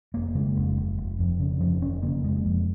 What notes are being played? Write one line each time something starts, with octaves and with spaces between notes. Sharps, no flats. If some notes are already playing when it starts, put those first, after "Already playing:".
F1 A#3
C#3 G#3
F1
F1
F1
F2
C#3
F1 F3
F1 C#4
C#3 A#3
F1 G#3
F2